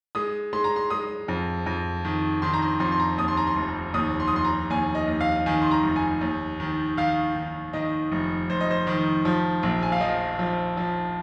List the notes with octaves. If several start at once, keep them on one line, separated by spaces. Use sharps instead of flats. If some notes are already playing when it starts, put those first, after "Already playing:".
G#3 D#6
G#3 C6
A#5
C6
G#3 D#6
F2
F2
D#3
D#3 C6
A#5
C6
F2 C6
C6
A#5
D#2 D#6
C6
A#5
C6
F1
D#2 D#6
C6
D#6
F1 C6
A#5
D#2 G#5
D#5
D#2
F5
D#3 G#5
C6
A#5
F1
G#5
D#2
D#3
D#3 F5
D#3
D#3 D#5
F1
F1 C5
D#5
C5
D#3
F3
A#1
G#5
F5
F3 D#5
F3
F3